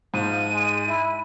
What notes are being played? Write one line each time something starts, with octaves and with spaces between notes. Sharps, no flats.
G#2 F3 D#7
G#3
E4